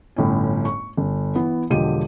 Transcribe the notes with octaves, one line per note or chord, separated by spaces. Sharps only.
G1 A2 C#4
C#6
G1
E3 B3
E1 D3 F3 G4 D#5 D#7